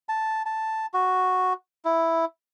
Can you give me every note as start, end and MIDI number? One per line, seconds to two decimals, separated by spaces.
0.09 0.42 81
0.46 0.86 81
0.94 1.53 66
1.85 2.25 64